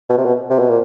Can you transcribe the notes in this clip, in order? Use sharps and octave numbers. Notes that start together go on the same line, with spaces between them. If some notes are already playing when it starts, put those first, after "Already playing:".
B2
C3
B2
C3
B2
A#2